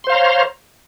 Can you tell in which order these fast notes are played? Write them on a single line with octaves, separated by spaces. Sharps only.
C6 C5 F5 A#5 C#5